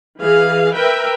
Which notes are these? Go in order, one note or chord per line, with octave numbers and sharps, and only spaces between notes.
E3 G#4 F5
A#4 B4 E5 G5